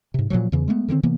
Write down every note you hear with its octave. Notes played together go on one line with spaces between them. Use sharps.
G#2 C3
A#2 C#3 F3 F#3
E2 C#3 E3
G#3 A3 B3
D3 D#3 A#3 C4
C3 E3 A#3 B3